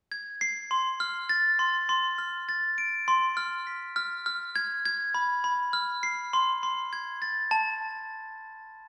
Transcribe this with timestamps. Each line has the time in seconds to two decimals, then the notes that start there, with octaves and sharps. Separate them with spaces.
0.12 G#6
0.41 C7
0.71 C6
1.00 F6
1.29 A6
1.59 C6
1.89 C6
2.18 F6
2.49 A6
2.78 D7
3.08 C6
3.37 F6
3.67 B6
3.96 F6
4.26 F6
4.56 G#6
4.85 G#6
5.14 B5
5.44 B5
5.73 F6
6.03 C7
6.33 C6
6.63 C6
6.93 G#6
7.22 A6
7.51 A5